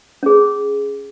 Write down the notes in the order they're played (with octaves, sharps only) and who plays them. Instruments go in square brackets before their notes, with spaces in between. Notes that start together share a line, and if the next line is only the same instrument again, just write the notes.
[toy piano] C#4 G#4